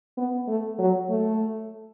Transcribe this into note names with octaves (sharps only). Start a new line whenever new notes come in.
B3
A3
F#3
A3